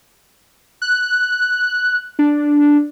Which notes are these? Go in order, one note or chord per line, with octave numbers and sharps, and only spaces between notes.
F#6
D4